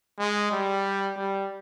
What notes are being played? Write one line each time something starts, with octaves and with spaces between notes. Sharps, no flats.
G#3
G3
G3